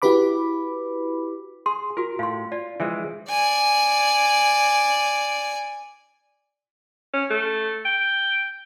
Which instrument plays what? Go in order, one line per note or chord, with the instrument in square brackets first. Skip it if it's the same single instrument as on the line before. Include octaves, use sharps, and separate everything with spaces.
[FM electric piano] E4 F#4 G4 B4 B5 D6
[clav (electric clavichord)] G#4 [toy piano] C6
[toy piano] F4 F#4 [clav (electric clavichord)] A#4
[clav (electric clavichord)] A2 [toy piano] F5 C6
[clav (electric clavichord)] F4 [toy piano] D5
[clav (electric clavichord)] E3 F3 G#3 [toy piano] D4 E5
[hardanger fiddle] D5 G#5
[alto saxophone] C#4
A3
G5